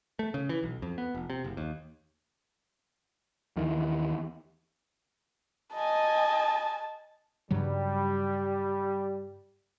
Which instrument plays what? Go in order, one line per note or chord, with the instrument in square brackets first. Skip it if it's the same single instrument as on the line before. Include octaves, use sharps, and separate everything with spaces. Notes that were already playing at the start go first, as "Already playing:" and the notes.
[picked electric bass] A3
C#3
E3
B1
F2
B3
F1
C3
F#1
D#2
D#2 D#3 E3
[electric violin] D#5 G#5 [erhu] A5
[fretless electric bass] G2 C#3 F#3 [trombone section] G3